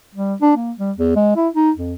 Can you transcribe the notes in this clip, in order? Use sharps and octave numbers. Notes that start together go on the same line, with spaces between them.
G3
D4
A#3
G3
E2
G#3
E4
D#4
F2